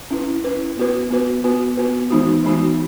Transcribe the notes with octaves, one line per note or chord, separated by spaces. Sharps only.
C#4 E4 B4
C#4 E4 B4
B3 F#4 B4
B3 F#4 B4
B3 F#4 B4
B3 F#4 B4
E3 G#3 B3 D#4 F#4
E3 G#3 B3 D#4 F#4